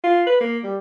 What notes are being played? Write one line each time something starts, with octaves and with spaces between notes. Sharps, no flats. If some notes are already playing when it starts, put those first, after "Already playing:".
F4
B4
A#3
G3